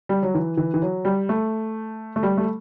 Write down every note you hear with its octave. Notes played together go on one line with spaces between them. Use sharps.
G3
F#3
E3
E3
E3
F#3
G3
A3
A3
G3
A3